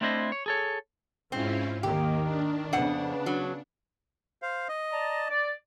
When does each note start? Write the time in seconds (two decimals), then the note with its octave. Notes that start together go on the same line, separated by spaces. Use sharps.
0.01 A3 C4 D4 E4 C5 D#5
0.32 C#5
0.46 G#4 A4 C#5
1.32 G#2 C4 C#4 E4 F4
1.83 D#2 D#3 A#3 G4
2.22 D4
2.73 F2 C#3 B3 F#5
3.26 F#3
4.42 C5 F5
4.69 D#5
4.93 D5 A5 A#5
5.30 D5